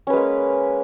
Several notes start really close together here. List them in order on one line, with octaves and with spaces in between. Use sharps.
C#4 B4 G#3 A#3